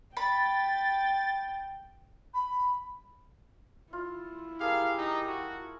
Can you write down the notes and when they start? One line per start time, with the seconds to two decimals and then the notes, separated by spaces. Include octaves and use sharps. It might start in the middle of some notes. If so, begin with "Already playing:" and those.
0.17 G5 B5 A6
2.34 B5
3.93 E4 F4
4.61 G4 G#4 A#4 F5 A5
4.98 D#4
5.27 F#4